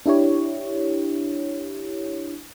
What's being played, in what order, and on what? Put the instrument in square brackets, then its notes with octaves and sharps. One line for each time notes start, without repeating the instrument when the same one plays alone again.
[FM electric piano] D4 E4 G4 C#5